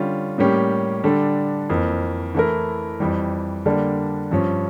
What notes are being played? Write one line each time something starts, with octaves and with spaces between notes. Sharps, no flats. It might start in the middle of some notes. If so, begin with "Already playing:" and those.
Already playing: D3 G3 C#4 F4
A2 G3 A#3 C#4 G4
D3 G3 D4 A4
F2 E3 A#3
E3 A3 E4 A#4
F2 E3 G3
D3 G3 A#3 D4
G2 F3 C#4